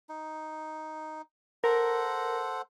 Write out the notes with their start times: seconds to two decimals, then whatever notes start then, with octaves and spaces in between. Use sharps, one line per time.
0.09 D#4
1.64 A4 A#4 C5 F#5